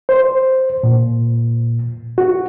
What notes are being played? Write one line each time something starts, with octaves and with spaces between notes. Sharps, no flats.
C5
A#2
F#4